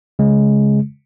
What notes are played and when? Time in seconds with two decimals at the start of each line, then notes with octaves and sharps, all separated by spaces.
0.19 C#3 G#3